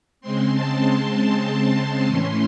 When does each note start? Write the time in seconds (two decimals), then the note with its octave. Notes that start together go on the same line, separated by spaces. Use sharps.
0.21 C#3 G#3 C4 C6
0.52 A5
0.83 C6
2.07 A2 E3 A3 C#4 C6